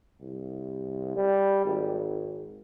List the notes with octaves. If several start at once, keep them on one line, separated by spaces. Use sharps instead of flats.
C2
G3
G#1